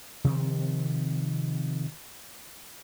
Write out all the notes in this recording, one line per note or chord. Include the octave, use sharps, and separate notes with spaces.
C3 D#3 F3 C4